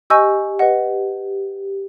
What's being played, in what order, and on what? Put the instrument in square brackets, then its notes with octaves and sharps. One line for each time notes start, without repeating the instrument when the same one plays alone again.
[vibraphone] G4 [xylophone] D#5 G#5 C#6 E6 G6
[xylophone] B4 D#5 F#5